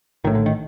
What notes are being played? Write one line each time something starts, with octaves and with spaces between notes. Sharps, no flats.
A#1 A2 D#3
D3
D#3